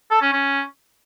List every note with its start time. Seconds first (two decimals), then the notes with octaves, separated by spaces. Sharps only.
0.11 A4
0.22 C#4
0.33 C#4